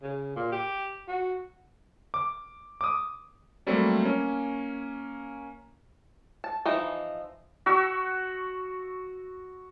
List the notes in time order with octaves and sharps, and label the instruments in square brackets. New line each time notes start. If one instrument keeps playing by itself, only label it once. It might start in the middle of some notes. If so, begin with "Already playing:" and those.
[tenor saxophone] C#3
A#2
G4
F#4
[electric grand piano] D6
D6 D#6
F#3 G3 A3 A#3 C4
A#3 C#4
[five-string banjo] A5
E3 F3 D#4
[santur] F#4 C#6 E6